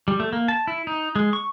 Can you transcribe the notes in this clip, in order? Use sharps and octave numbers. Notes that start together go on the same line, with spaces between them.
G3
A3
A#3
A5
E4
D#4
G#3
C#6